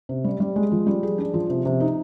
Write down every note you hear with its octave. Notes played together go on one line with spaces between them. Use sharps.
C3
G3
G3
G#3
F3
G3
G#4
D4
F3
C3
C3
D#4